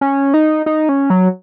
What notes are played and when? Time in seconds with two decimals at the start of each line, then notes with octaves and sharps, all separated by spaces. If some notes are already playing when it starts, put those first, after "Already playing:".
0.01 C#4
0.34 D#4
0.66 D#4
0.89 C#4
1.10 F#3